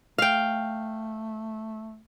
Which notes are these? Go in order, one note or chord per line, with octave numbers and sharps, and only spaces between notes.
A3 F5 G5